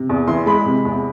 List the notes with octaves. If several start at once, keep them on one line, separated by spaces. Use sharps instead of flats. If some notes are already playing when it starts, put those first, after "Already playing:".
Already playing: C3
E2
E3 C6
G#3 B5
C3
E2